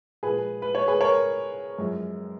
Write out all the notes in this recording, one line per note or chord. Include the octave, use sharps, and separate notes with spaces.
A#2 F3 G#3 G#4 B4
B4
C#5
G#4 B4
A#4 C#5
F#2 F3 G#3